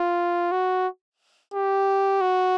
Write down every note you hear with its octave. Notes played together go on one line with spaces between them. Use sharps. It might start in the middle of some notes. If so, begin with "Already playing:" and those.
Already playing: F4
F#4
G4
F#4